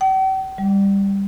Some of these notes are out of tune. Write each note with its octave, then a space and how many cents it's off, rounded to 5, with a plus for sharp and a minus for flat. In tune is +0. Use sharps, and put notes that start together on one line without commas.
G5 -45
G3 +15